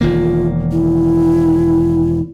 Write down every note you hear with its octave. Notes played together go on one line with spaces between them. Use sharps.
E1 D#3 A#3 F4
E4